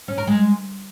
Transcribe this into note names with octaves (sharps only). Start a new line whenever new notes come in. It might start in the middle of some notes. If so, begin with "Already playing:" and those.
C#4
A#4
G#3